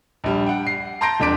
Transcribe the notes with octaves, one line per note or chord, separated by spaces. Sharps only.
A#1 G3
F#5 G5
C7
A5 A#5 C6 G6 A#6 D7
E1 F2 D4 D6 B6 D7